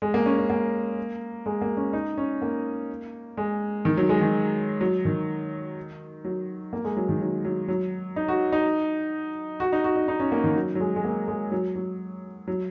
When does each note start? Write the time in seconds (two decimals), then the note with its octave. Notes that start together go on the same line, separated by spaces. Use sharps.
0.02 G#3
0.14 A#3
0.26 C#4
0.38 C#4
0.50 A#3
1.46 G#3
1.61 A#3
1.77 C#4
1.93 D#4
2.18 C#4
2.42 A#3
3.37 G#3
3.85 D#3
3.97 F#3
4.09 G#3
4.21 D#3
4.81 F#3
5.05 D#3
6.25 F#3
6.73 A#3
6.84 G#3
6.97 F#3
7.09 D#3
7.21 F#3
7.45 F#3
7.68 F#3
8.16 D#4
8.28 F#4
8.52 D#4
9.60 F#4
9.72 D#4
9.84 F#4
9.96 D#4
10.08 D#4
10.20 C#4
10.32 A#3
10.44 D#3
10.56 F#3
10.75 F#3
10.80 G#3
10.96 G#3
11.04 A#3
11.28 G#3
11.52 F#3
11.75 F#3
12.48 F#3